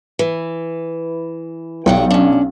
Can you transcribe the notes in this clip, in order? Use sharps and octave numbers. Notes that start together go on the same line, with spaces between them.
E3
B1 G3 F#5 G5
C#4 D4